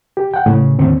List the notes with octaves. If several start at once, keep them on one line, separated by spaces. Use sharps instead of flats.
G4
F#5 G5
A2 C#3
D#2 A2 D3 C4